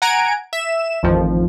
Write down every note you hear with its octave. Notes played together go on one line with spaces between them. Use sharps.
F#5 G#5 A#5 G#6 D7
E5 E7
A1 F2 D#3 F3